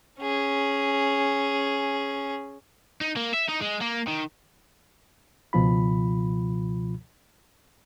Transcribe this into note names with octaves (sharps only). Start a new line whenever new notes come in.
C#4 G#4
D#4
A#3
E5
D#4
G#3
A#3
D#3
C#2 B2 F3 F4 B5